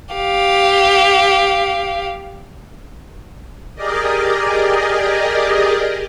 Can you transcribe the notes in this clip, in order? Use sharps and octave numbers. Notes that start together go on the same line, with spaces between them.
G4 F5
G4 G#4 A#4 D5 D#5